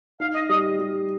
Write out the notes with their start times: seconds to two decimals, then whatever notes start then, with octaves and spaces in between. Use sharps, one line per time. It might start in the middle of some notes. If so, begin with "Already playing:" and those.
0.20 D#4 F5
0.35 D#5
0.49 G3 D#5
0.79 G3